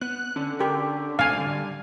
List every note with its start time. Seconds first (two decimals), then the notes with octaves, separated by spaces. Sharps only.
0.01 B3 F#6
0.36 D3 C#4
0.60 G4 A#4
1.19 G#2 C4 F5 G#5
1.36 G3